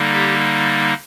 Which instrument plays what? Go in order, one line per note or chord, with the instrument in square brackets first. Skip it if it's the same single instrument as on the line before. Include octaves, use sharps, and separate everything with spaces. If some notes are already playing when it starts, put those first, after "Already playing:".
Already playing: [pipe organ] D3 G3 A#3 D#4
G4